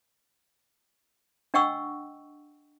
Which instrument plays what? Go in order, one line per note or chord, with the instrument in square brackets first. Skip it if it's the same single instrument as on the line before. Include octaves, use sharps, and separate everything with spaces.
[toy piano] D4 D#5 F#5 G5 C#6 E6